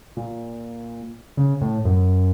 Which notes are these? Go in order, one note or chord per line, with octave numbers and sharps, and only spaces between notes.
A#2
C#3
A2
F#2